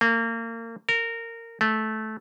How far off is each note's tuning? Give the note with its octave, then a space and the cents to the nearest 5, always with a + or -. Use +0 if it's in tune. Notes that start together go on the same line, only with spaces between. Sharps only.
A#3 -30
A#4 -20
A3 -15